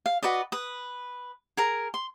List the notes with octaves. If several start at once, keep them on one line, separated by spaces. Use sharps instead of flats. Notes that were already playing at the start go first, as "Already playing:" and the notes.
F5
F#4 B4 D5 D#5
B4 D#6
G#4 A#4 A#5
C6